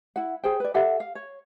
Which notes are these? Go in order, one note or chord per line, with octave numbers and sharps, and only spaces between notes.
E4 F#5
G#4 C5 G5
B4 D5
G4 A4 E5 F#5
F5
C#5